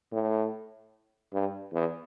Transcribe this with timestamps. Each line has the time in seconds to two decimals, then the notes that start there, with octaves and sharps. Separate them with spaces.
0.12 A2
1.33 G2
1.73 E2